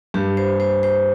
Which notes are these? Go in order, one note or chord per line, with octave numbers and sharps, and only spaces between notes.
G2 G4
C5
C5
C5